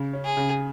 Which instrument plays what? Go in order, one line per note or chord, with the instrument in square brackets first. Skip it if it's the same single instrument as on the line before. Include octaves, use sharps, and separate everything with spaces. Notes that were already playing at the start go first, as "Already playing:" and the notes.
Already playing: [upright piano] C#3
C#4
[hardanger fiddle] G#4
[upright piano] C#3